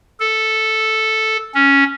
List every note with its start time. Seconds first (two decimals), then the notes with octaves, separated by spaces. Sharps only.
0.20 A4
1.55 C#4